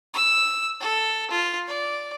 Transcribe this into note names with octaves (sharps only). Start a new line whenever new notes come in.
E6
A4
F4
D5